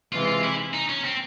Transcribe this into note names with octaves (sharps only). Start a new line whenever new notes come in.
C3 E3 G#3 F4
F4
E4
D#4
C#4
C4